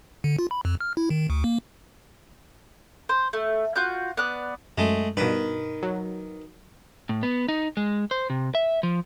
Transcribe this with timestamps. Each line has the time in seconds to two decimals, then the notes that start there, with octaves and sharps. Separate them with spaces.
0.24 D3
0.39 F4
0.51 B5
0.65 F2
0.81 F6
0.97 E4
1.10 D#3
1.30 D2
1.44 A#3
3.09 C5
3.33 A3
3.76 F4 F#4 F#6 G6
4.17 B3 D5 F#6
4.78 F#2 G#3 A3
5.17 G2 B2 D#3 B4
5.83 F#3
7.09 A2
7.23 B3
7.48 D#4
7.77 G#3
8.11 C5
8.30 C3
8.55 E5
8.83 F3